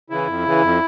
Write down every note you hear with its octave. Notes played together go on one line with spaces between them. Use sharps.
C#3 E3 E4
F2
C#3 E3
F2